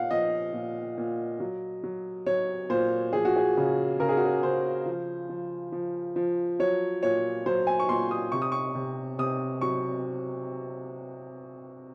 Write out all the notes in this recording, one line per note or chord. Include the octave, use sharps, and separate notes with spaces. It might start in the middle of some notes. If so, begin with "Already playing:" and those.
Already playing: A#2 F5 F#5
F3 D#5
A#2
A#2
F#3
F#3
F#3 C#5
A#2 C5
F3 G#4
F#4
G#4
C#3
C#3 A#4
G#4
F#4
G#4
C#3 C5
F3
F3
F3
F3
F#3 C#5
A#2 C#5
F#3 C5
G#5
C#6
A#2 C6
D#6
C3 C#6
D#6
C#6
C3
C3 D#6
F#3 C#6